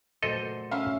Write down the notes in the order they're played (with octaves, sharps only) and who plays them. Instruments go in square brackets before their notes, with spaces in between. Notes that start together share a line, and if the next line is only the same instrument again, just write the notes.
[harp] A#2 F#3 A3 [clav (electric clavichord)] A4 D#5 [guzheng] C5
[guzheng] C#4 E5 [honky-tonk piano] F5